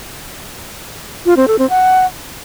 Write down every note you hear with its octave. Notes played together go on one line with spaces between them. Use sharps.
F4
C4
A4
C4
F#5